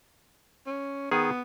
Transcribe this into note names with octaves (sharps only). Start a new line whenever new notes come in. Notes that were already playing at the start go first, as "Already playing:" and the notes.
C#4
D#3 B3 G#4